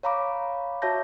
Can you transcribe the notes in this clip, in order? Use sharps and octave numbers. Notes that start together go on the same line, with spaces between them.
C#5 F5 A#5 B5 D6
F#4 C#5 E5 A5 G6 A#6